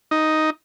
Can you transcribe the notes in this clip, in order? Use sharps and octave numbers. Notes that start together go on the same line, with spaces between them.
D#4